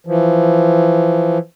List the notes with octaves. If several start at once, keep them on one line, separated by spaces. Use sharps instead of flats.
E3 F3